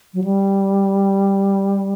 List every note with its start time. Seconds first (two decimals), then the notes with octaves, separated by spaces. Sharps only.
0.14 F#3
0.24 G3